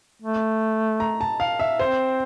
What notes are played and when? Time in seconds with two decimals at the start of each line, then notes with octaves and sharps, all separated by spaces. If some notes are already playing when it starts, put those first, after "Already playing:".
0.22 A3
1.00 A#5
1.21 A5
1.40 F5
1.59 E5
1.79 C4 C5